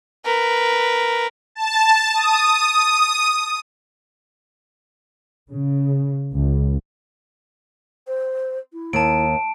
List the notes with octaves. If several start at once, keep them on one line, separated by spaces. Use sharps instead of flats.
A#4 B4
A5
D#6
C#3
C#2
C5
E4
D#2 A5 D7